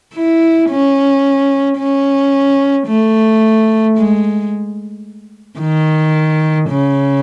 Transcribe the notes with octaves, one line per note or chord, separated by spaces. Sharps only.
E4
C#4
C#4
A3
G#3
D#3
C#3